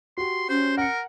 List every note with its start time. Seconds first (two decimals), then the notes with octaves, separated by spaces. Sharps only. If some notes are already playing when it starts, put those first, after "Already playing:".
0.17 F#4 G4 C6
0.49 C#4 C5
0.78 A#4 F#5 C#7